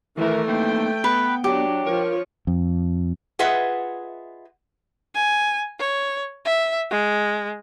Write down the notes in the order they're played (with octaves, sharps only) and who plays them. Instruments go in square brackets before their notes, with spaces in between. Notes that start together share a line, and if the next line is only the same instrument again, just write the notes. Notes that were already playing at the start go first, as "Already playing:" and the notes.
[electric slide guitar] D#3 E5 [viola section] E3 A#4 [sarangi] A3
[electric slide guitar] A#3 C4 D#4 [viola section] G5
[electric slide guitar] B3 [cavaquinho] B4
[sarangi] F#3 [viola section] D4 [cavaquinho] G4
[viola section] F3 [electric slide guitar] A#4 [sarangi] C#5
[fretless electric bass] F2
[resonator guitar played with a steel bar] F4 G#4 B4 D#5 E5 F#5
[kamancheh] G#5
C#5
E5
G#3